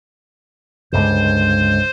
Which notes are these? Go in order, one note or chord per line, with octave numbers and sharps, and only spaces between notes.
C#2 G2 D3 C5